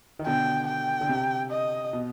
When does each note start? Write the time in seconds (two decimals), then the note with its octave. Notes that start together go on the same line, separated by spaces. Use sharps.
0.19 D#3
0.26 B2 D3 G5
0.67 G5
1.01 D3
1.09 C3
1.51 D#5
1.93 B2